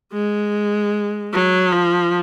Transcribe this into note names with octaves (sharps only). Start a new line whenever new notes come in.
G#3
F#3
F3